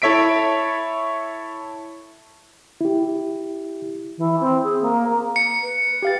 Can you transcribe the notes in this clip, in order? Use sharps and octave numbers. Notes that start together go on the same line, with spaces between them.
E4 A4 C#5 E5 B6 D7
E4 G4
E3
C4
G#4
A#3
C#7
B4
G4 F5 A6